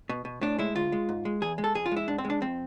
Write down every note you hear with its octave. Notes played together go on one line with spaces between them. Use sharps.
B2
B2
A2 D4
G#3 E4
D2 F4
G#3
G#2
G#3
E2 G#4
G#3
A4
F2 G#4
F4
G#3
E4
G#2 D4
C4
G#3
D4
F2 C4